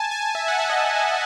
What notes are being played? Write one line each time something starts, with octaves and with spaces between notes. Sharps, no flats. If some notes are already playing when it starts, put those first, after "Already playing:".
Already playing: G#5 A5
G#5
E5
F#5
E5
D#5